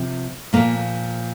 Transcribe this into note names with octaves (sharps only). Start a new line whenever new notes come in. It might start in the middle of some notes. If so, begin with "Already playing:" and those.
Already playing: C3 F3
A#2 F3 A#3